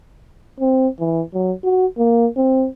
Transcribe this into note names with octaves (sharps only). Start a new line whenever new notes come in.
C4
E3
F#3
F#4
A#3
C4